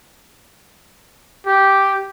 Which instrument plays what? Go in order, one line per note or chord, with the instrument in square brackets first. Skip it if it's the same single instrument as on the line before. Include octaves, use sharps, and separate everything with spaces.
[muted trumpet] G4